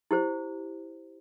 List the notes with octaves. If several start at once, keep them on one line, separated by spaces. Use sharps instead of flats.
E4 G4 C5